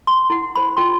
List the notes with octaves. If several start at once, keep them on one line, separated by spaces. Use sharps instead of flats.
C6
E4 F#5
C5 B5
F4 G5 C6